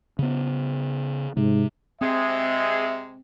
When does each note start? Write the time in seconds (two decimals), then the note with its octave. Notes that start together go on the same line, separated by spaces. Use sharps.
0.19 C#3 B3
1.37 G#2 C3
2.01 C3 G#3 C4 G#4 E5